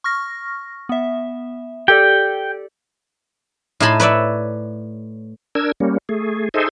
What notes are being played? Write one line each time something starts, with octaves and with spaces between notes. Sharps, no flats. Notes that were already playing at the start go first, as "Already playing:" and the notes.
C#6 F6 A#6
B3 E5
G4 A4 D5 G5
A2 D#4 G#5 A5 B5 C6
B4 C#5 D5 E5
D4 A#4 E6 G#6
G3 A#3 C#4
A3 G#4
D#4 G#4 A4 C5 D#5 E5